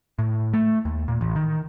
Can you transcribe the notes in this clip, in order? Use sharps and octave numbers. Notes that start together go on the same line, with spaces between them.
A2
A3
D#2
A#2
A1
D#3